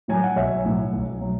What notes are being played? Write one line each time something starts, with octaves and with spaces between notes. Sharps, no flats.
A2 F#3 G#5
F#5
B1 C#5 E5
A2 F#3
B1
F#3